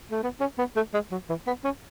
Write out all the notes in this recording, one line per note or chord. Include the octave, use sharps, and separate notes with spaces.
A3
B3
C#4
B3
A3
G#3
F#3
E3
B3
C#4